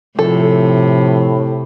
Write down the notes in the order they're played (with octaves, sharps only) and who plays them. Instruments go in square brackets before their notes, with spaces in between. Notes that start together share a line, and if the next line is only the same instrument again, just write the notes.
[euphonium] A2 [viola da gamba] C3 [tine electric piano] F3 [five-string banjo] A4